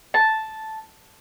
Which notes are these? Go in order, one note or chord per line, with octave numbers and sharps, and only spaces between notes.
A5